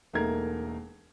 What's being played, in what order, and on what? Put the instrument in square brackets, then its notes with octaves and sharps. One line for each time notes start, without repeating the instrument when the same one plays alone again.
[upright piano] E1 A3 A#3 D#4 A#4 G#6